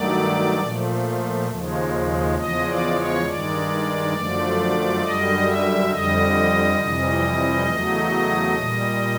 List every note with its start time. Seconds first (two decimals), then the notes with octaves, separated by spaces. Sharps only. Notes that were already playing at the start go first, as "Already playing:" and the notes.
Already playing: G2 D#3 F#3 A3 D5
0.59 A#2 F3 A3
1.48 D#2 C#3 F3 G#3
2.37 E2 C#3 F3 G#3 D#5
2.65 D5
2.95 C#5
3.24 G2 D#3 G#3 D5
4.13 F#2 D3 F3 A3
5.01 F#2 D3 G3 D#5
5.45 E5
5.90 F2 D3 G3 D#5
6.78 F2 C3 E3 G3
7.67 E2 C#3 F#3 A3
8.56 A#2 G3